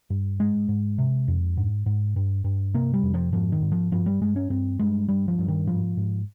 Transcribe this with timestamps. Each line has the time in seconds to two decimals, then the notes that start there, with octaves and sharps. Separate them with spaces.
0.10 G2
0.39 G#2 G#3
0.69 G#2
0.98 C3
1.28 F2
1.57 G#2
1.86 G#2
2.16 G2
2.44 G2
2.74 C3 A#3
2.93 G3
3.03 F2
3.14 F3
3.33 G#2 F3
3.52 D#3
3.62 G#2
3.72 F3
3.91 G2 F3
4.06 G3
4.21 G2 G#3
4.36 C#4
4.50 G2 C4
4.79 G2 G#3
5.08 G2 G3
5.28 F3
5.39 G2
5.48 D#3
5.67 G#2 F3
5.97 G#2